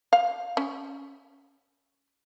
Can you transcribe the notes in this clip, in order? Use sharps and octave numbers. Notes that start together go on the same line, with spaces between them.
F5
C#4